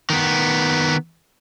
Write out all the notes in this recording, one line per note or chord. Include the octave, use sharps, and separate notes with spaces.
D#3 B3